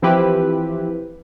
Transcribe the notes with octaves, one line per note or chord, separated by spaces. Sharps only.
E3 F3 C4 E4 G4 B4